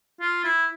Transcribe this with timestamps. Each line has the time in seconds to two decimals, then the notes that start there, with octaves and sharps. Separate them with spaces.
0.21 F4
0.44 E4